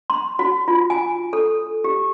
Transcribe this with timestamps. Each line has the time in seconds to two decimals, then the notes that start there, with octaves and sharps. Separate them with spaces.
0.10 C6
0.39 F#4
0.68 F4
0.90 G#5
1.33 A4
1.84 G4